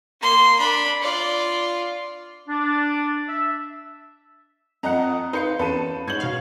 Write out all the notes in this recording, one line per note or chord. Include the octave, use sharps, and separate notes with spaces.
A#3 C6
D4 B5
F4 D5
D4
E5
F2 D#5 F#5 A#5 F#6
D#4 B4 C5 F5 C#7
E2 C#4 F#4 A4 B4 A5 D#7
G#2 C5 C#5 F#5 G#6 F#7
B2 F5